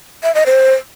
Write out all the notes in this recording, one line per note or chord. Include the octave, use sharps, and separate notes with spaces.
E5
D#5
C5